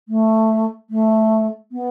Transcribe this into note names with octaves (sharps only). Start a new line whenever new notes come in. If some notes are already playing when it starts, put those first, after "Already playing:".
A3
A3
B3